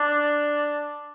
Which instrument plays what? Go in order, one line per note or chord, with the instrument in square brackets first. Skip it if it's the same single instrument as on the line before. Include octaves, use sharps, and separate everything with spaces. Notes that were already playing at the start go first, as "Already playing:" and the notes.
Already playing: [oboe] D4